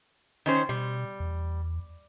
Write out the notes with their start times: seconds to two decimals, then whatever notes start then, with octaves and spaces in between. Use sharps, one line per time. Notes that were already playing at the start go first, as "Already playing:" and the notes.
0.46 D#3 C#4 C5
0.69 B2 G3
1.20 E2